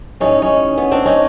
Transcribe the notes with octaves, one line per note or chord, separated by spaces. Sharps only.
A2 E3 G3 C#4 D#4
C#4 D#4
B3 C#4
C4 D4
C#4 D#4